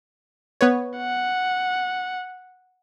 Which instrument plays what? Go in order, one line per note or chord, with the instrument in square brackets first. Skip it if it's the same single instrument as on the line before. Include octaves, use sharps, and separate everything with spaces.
[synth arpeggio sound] B3 B4 C#5
[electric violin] F#5